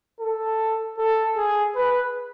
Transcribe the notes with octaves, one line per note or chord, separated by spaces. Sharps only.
A4
A4
G#4
B4